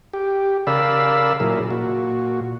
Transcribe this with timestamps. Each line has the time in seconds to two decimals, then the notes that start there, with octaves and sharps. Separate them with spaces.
0.13 G4
0.67 C#3 A#4 D5 F5 B5 E6
1.40 A#2 F#3 E4 G#4 A#4
1.71 A#2 F#4